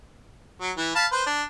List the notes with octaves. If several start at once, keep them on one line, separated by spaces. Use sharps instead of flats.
F#3
E3
F5 A5 B5
B4 C5
D4